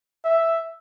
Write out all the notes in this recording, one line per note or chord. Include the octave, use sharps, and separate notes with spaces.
E5